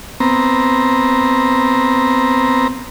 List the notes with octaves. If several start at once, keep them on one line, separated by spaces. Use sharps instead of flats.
B3 C4 A#5